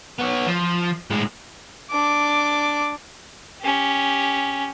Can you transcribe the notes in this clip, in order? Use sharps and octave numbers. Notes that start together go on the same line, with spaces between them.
B3 C#5
F3
A2 G#3
D4 D6
C#4 G4